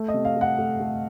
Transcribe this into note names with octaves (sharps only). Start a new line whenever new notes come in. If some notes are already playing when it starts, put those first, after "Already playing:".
Already playing: A3
D#5
C3
F5
A3 F#5
A3
A3